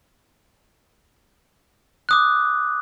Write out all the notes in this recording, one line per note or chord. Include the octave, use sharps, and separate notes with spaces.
D6 D#6 F#6